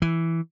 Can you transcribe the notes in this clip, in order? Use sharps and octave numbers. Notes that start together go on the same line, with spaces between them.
E3